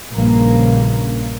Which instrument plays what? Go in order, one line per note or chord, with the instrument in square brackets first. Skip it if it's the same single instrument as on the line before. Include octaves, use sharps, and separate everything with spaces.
[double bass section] A#1 G2 C#3 A#3